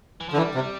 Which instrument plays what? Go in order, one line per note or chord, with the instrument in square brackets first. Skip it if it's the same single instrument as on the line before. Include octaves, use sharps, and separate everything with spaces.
[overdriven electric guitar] E3
F3
[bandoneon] D3
[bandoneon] E3 [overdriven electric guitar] G3
[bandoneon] C3